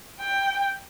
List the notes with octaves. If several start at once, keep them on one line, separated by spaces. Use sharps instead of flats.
G5